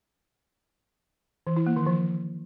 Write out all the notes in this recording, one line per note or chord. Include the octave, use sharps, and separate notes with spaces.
E3
E4
A#3
D#3
F3